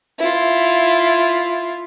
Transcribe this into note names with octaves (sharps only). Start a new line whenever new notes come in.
E4 F4